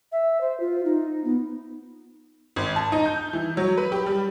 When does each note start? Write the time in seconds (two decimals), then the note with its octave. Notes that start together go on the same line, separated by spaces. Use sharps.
0.12 E5
0.41 C5
0.60 F4
0.85 D#4
1.24 B3
2.56 G#1
2.76 A5
2.92 D#4
3.06 G6
3.33 E3
3.57 F#3
3.77 B4
3.92 G4
4.06 G3